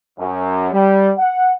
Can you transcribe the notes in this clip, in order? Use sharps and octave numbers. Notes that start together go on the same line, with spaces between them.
F#2
G3
F#5